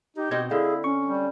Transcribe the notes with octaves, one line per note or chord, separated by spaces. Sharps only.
D#4 G4
B2 C4 D#4 A#4 G#6
D3 E4 G#4 F5
C#4 C#6
G3